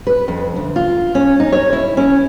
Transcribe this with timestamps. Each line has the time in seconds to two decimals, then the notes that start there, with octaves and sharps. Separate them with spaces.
0.07 B4
0.28 F2
0.56 D2
0.76 F4
1.15 C#4
1.40 D#4
1.52 C#5
1.73 E4
1.97 C#4